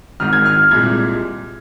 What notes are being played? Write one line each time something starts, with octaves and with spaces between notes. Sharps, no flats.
G#1 G#2 D#3 F6
G#6
F6
C2 A#2 G#3 G#6